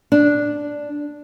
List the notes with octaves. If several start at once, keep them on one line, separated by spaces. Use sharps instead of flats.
D4